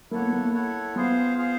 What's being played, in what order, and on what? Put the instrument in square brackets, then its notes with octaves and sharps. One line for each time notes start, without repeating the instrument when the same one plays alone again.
[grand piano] A#3 [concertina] E4 A4 C#5 F#5
[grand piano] B3
A#3
[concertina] E4 A4 C#5 F#5
[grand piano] B3 [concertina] F4 G#4 C5 F5
[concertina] F4 G#4 C5 F5